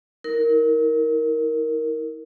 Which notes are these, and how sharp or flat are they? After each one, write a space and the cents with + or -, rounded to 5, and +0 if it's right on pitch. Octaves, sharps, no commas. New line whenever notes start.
E4 -45 A#4 +0